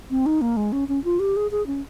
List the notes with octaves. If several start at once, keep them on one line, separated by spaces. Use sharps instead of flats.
C4
D#4
A#3
G#3
C#4
C#4
F4
G4
G#4
G#4
C#4